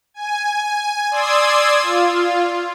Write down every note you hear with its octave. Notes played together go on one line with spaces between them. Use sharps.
G#5
D5 C6 D#6 E6 G#6
F4